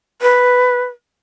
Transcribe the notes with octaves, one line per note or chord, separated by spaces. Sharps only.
B4